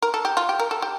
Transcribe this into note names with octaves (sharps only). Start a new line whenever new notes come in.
A#4
A4
G4
F4
G4
A#4
A4
G4